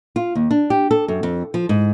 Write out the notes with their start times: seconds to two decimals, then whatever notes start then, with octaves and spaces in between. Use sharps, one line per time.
0.16 F4
0.35 D#2
0.51 D4
0.70 G4
0.91 A4
1.08 F#2
1.23 F2
1.54 F3
1.69 G#2